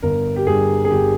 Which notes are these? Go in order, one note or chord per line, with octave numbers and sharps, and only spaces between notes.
G1 A#4
G4
G2 G3 G#4
G#4
G1 G4